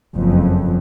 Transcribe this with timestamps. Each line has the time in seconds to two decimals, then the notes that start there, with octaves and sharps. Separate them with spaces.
0.16 F#1 F2